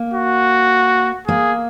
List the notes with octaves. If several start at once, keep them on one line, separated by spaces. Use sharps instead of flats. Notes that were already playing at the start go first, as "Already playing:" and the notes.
Already playing: A#3
F#4
A#3 G#4